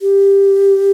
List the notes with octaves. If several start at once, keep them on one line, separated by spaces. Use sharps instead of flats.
G4